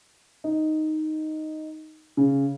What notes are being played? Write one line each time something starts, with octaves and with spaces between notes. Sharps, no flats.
D#4
C#3